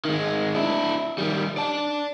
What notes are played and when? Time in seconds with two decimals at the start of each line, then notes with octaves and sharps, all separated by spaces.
0.05 D#3 G#3
0.55 D4 E4
1.18 D#3 G3
1.57 D5 A5